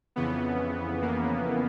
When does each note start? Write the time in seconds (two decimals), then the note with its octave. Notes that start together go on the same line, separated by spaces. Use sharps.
0.16 F2 C#3 E3 B3
1.02 A#3